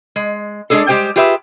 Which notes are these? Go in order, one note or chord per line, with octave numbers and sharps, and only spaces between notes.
G#3
G#3 C#4 D4 G#4 A4
G3 G#3 G4 C5 G5
F4 G4 G#4 B4 E5